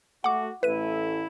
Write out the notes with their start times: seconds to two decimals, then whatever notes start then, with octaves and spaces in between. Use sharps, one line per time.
0.24 A3 F#4 F#5 D6
0.63 A1 A3 E4 B4 D#7